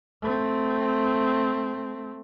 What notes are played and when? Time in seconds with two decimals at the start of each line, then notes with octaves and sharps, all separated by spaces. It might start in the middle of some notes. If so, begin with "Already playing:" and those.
0.22 A3 C4